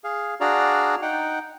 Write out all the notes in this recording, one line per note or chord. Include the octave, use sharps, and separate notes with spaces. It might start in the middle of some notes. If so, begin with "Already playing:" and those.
G#4 F5
D4 F#4 G#4 D5 F5 A#5
D#4 F#5 G5